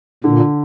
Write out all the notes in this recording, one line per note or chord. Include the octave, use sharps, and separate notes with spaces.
A#2 D3